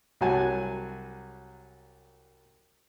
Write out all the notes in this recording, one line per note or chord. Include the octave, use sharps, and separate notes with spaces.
C2 F#3 F#4 G#5 A5